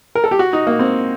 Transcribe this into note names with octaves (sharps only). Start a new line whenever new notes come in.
A#4
A4
G4
F#4
D#4
A#3
C4